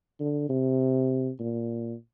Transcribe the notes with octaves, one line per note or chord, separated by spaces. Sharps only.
D3
C3
A#2